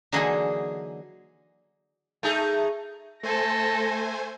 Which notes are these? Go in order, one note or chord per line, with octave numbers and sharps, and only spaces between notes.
D3 E3 F#3 A#3 D#4 G#4
A3 D#4 G#4
A3 A4 C5 G#5 A#6